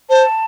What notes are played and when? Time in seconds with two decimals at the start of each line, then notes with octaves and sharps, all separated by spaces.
0.10 C5 A5